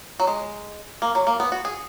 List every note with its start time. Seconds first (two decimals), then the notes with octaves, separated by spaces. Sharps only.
0.20 F#3
0.27 G#3
1.02 A#3
1.15 F#3
1.27 A#3
1.40 B3
1.52 F#4
1.65 G#4